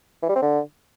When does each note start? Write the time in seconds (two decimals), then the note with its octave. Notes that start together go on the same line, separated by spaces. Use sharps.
0.23 E3
0.29 G3
0.35 C4
0.42 D3